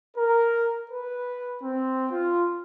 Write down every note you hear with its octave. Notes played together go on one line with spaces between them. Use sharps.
A#4
B4
C4
F4